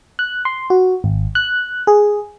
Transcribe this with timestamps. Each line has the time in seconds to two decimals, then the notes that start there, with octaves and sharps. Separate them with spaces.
0.19 F#6
0.45 C6
0.70 F#4
1.04 G#1
1.35 F#6
1.87 G#4